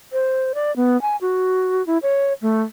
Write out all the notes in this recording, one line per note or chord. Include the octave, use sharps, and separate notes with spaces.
C5
D5
B3
G#5
F#4
E4
C#5
A3